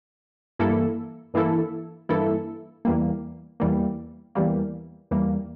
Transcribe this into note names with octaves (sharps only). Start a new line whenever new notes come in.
G2 E3 A#3 E4 A4
G2 E3 A#3 E4 A4
G2 E3 A#3 E4 A4
E2 E3 G3 A#3
E2 E3 G3 A#3
E2 E3 G3 A#3
E2 E3 G3 A#3